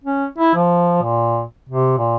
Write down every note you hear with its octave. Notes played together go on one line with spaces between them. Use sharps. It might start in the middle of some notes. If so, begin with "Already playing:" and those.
C#4
E4
F3
A#2
C3
A#2